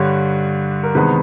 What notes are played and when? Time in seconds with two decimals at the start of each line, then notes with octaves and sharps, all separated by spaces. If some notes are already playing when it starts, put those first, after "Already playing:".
Already playing: G2 D3 G3 C#5
0.83 A#4
0.95 E2 C3 D#3 G#3 B3 B4